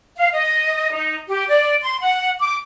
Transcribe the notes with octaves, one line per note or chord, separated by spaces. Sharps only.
F5
D#5
D#4
G4
D5
C6
F#5
D6